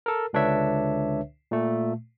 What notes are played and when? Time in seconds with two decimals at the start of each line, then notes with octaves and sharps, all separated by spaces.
0.06 A4 A#4
0.33 C#2 D3 D4 B4 C#5 E5
1.51 A#2 A3